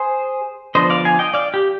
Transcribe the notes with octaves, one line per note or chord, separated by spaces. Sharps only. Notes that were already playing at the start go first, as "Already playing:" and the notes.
Already playing: G#4 C5
D3 F3 B3 D4 C5 D#5
D5 F5
F5 G#5
D#5 G5
D5 F5
G4